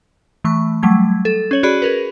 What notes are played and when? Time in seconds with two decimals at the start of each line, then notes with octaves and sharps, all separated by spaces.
0.44 E3 A3 C#6
0.83 F#3 G3 A3 G#6
1.25 A4
1.51 C#4 C#5 F#7
1.63 F#4 G#4 D5 B5
1.82 G#4 A#4 B4